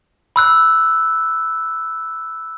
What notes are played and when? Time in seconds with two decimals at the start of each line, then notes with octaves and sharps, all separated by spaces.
0.36 B5 E6 F#6